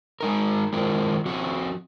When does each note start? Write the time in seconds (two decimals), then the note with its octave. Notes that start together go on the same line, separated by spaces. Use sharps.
0.21 G#3 D#4 A#4
0.73 D#3 G#3 C4 F4 A#4
1.26 F3 C4 F#4